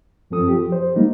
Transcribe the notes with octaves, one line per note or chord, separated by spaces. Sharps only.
F#2 F3 C4 A4 D#6
F3 G4
C5
F#3 G3 A#3 D#4